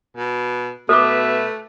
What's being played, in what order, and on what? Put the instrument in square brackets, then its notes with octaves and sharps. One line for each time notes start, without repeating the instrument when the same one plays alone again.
[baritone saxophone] B2
[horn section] B2 B4 E5 [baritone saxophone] A3 [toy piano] A4 D6